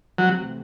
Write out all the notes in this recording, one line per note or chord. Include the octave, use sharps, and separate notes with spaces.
C3 E3 F#3 A3 C4